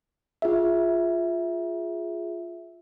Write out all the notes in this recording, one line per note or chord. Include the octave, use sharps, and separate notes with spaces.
F4 G#4 E5